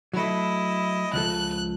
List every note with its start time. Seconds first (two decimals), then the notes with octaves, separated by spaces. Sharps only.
0.13 F#3 A3 E4 D#5
1.13 C#2 F3 A4 F#6